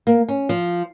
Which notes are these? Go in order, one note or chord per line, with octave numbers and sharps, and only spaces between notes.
A#3
C#4
F3